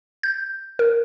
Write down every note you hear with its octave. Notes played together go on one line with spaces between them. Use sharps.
G6
A#4